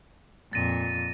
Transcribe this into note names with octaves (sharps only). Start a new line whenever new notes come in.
F2 A#2 A6 A#6 D#7